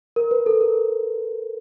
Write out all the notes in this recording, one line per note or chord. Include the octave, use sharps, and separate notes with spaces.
A#4
B4
A4
A#4